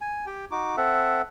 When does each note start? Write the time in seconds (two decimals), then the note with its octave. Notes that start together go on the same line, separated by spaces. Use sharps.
0.01 G#5
0.27 G4 G5
0.51 D#4 F#4 D6
0.77 C4 A4 E5 F#5